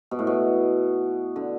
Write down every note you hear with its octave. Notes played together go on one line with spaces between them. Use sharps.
B2
A2
B2
D3